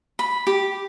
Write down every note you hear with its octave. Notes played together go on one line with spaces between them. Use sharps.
B5
G4